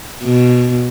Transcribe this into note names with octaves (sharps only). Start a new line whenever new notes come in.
B2